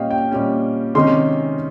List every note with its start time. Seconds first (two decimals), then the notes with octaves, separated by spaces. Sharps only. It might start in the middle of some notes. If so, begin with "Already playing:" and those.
Already playing: A#2 G3 C#4 D#5 F5 G5
0.11 G5
0.32 A#2 G3 C#4
0.95 C3 D#3 G#3 C#4 C6